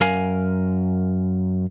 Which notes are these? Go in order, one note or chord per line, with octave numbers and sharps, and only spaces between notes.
F#2 A#4 F5 G#5